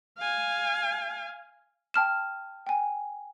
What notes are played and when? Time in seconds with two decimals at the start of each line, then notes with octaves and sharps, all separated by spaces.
0.18 F5 G#5
1.94 G5 A5 F6 E7
2.67 G5 G#5